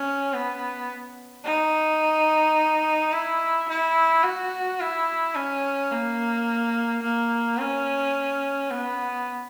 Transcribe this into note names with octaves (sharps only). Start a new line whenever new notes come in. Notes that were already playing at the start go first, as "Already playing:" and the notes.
Already playing: C#4
B3
D#4
E4
E4
F#4
E4
C#4
A#3
A#3
C#4
B3